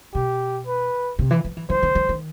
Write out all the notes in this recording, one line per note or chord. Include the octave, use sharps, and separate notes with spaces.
B2 G4
B4
C3
E3
F3
E3
E3 C5
D#3
E3
D#3